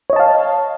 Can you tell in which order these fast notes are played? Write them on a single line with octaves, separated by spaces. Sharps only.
C#5 D#5 A5 F5